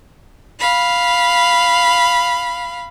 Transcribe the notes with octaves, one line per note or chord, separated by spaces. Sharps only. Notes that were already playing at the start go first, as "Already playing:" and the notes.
F5 B5